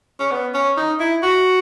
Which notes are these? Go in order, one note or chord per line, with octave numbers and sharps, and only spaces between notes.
C#4
B3
C#4
D#4
E4
F#4